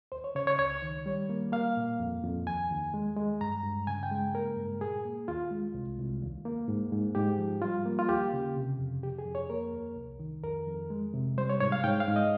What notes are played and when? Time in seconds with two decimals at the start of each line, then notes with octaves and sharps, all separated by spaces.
0.12 D#2 C5
0.24 C#5
0.35 C#3 C#5
0.47 C#5
0.59 C#2 C#5
0.82 D#3
1.06 G3
1.30 A#3
1.52 A#3 F5
1.77 A#2
2.00 F2
2.24 F2
2.46 D#2 G#5
2.71 D#2
2.94 G#3
3.16 G#3
3.41 G2 A#5
3.63 G2
3.87 C#3 G#5
4.03 G5
4.11 G#3
4.34 A#3 A#4
4.57 G2
4.81 A#2 G#4
5.05 A#3
5.28 D#2 F4
5.51 G#3
5.75 C2
5.98 C2
6.22 D#2
6.45 A#3
6.68 G#2
6.92 G#2
7.15 G#2 G4
7.39 F3
7.62 G3 F4
7.86 A#3
7.99 F4
8.09 D#2 G4
8.33 C#3
8.56 C3
8.79 F2
9.03 F2 G4
9.19 G#4
9.26 F2
9.35 C#5
9.50 A#3 A#4
9.73 D#2
9.96 C2
10.19 D#3
10.44 F2 A#4
10.67 F2
10.90 G#3
11.14 C3
11.38 G3 C5
11.50 C#5
11.60 G#2 C#5
11.72 F5
11.84 G#2 G5
12.00 F5
12.08 G#2
12.16 D#5